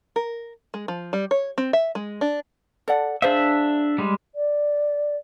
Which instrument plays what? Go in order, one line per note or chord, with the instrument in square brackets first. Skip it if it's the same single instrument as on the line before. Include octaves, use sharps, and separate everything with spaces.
[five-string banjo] A#4
G#3
F3
G3
C#5
C4
E5
G#3
D4
[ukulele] A4 D5 F#5
[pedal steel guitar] D4 E5 [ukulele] G#4 C5 F5
[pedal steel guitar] G3 G#3
[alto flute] D5